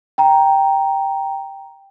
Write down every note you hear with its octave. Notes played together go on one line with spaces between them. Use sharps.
G5 A#5